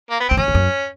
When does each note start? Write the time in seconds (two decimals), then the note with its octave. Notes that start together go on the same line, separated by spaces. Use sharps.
0.10 A#3
0.20 B3
0.29 E2 C4
0.37 F2 C#4
0.48 F2
0.55 F#2